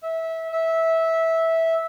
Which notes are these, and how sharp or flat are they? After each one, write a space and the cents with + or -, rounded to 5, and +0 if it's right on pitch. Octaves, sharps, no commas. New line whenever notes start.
E5 -20
E5 -15